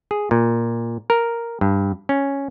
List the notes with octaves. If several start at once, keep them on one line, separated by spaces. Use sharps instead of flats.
G#4
A#2
A#4
G2
C#4